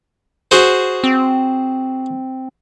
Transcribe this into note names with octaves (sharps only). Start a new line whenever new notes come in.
F#4 G#4 C5
C4